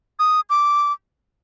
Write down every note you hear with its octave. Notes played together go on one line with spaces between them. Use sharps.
D#6
D6